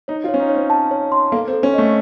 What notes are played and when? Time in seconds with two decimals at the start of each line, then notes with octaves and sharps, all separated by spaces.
0.08 D#4 C#5
0.24 F4
0.29 C#5
0.34 C#4
0.40 D#4
0.49 C#5
0.55 C4
0.70 A5
0.91 C#5
1.12 C6
1.32 A#3 A4
1.48 C4
1.53 A4
1.63 C#4
1.74 A3 D#5